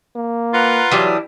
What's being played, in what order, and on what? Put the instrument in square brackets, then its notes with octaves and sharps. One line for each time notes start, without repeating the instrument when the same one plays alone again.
[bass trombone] A#3
[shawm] F4 [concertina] B4 F#5 A#5
[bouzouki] E3 G3 D4 [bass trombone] F#3 [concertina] G4 D#6 E6